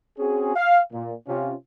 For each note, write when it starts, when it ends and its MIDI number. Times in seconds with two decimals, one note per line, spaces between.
0.18 0.52 60
0.18 0.52 61
0.18 0.52 66
0.18 0.52 68
0.56 0.79 77
0.92 1.14 46
1.28 1.53 48
1.28 1.53 61
1.28 1.53 65